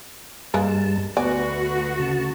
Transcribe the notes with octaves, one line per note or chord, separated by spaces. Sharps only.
G2 G3 G#3 A#3 B4 A5
D2 B3 F#4 B4 D5 G#5
C#3 A5